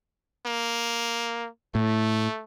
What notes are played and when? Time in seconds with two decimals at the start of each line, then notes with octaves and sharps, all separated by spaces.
0.46 A#3
1.75 A2 A3